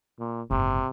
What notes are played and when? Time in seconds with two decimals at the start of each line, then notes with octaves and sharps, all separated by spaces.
0.19 A#2
0.51 F#1 G#2 C3